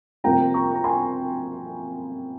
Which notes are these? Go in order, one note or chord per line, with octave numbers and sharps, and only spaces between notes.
F2 C3 G3 A#3 G5 A#5
A#5 C#6
A#5
G#5 C6